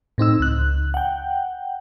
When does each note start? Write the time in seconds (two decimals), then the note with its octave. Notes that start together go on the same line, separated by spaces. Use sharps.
0.18 A2 C4 D#4 E6
0.40 C#2 F#6
0.94 F#5 G5